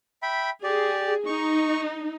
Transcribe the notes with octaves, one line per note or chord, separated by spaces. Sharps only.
E5 G5 B5
G4 G#4 D5
D#4 C#6